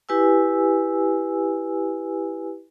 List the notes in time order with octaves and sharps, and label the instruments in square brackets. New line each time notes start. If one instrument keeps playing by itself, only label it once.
[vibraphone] E4 G4 B4 G#5 E6